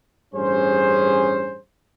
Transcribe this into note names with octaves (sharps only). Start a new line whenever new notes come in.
A1 G2 C#4 G#4 C5